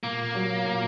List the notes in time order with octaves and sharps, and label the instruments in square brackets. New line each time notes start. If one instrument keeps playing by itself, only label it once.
[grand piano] A#2 [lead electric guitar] A#3
[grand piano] F#3
A#2